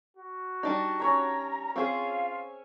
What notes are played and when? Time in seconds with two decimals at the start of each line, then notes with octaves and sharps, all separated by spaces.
0.17 F#4
0.63 G3 D4 D#4
1.00 C#4 C#5 E5 A#5
1.76 C4 F4 G#4 C#5 E5 F5 G#5